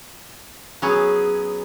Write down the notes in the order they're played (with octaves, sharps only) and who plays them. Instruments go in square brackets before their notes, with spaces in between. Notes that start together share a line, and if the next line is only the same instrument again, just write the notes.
[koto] F#3 B3 C#4 G#4